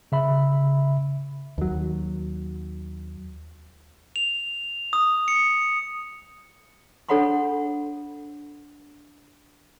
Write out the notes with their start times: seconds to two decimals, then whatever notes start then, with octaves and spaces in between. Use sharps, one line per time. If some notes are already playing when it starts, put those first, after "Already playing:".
0.12 C#3 E5 B5
1.58 D#2 F#3
4.16 F7
4.93 D#6
5.28 C#7
7.09 D4 A4 C#5 F#5 B5 C6